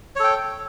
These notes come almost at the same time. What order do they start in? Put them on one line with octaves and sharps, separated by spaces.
C#5 A4 G5